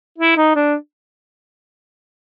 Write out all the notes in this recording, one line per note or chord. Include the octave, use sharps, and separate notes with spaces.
E4
D#4
D4